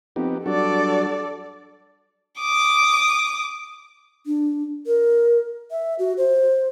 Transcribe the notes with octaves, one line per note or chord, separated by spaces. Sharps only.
F2 B3 D#4 G4
G2 F#3 F#4 A4 D5
D6 D#6
D4
A#4
E5
F#4
C5